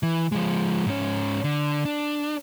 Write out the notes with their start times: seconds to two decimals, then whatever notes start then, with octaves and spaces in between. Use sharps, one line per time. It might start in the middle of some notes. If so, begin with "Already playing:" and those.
0.03 E3
0.32 F3 G#3
0.87 G#2 C#4
1.44 D3
1.85 D4